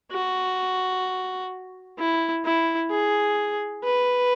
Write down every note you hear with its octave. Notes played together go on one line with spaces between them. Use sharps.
F#4
E4
E4
G#4
B4